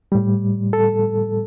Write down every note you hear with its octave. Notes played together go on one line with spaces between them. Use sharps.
A2 G3
A4